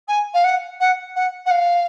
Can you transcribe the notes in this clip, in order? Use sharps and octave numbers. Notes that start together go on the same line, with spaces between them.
G#5
F5
F#5
F#5
F#5
F#5
F5